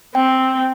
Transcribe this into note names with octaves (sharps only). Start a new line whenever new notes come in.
C4 G5